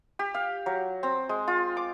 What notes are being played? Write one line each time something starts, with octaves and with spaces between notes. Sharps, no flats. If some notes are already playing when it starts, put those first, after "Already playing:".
G4
F5
F#3
C4
G#3
F4
D6